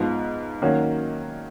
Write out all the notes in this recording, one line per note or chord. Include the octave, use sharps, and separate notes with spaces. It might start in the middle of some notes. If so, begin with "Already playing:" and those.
Already playing: G#2 F3 B3
D#3 F#3 A#3 C#4 F#4